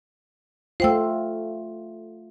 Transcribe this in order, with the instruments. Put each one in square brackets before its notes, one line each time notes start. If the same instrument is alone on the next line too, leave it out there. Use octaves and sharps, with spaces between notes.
[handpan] A3 F4 [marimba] C5 G5 E6